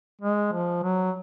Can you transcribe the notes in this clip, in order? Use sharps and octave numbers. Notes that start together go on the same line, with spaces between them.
G#3
F3
F#3